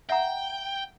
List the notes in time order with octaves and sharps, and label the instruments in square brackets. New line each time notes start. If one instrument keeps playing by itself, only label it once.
[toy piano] E5 F#5 A#5 [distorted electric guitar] G5